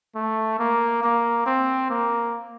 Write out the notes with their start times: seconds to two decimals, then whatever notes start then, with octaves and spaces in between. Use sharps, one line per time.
0.15 A3
0.59 A#3
1.03 A#3
1.46 C4
1.90 A#3